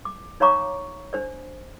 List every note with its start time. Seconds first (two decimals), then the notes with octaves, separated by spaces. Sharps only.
0.05 D6
0.40 D#4 C#5 F5 A#5 C#6 D6
1.13 D4 C5 D5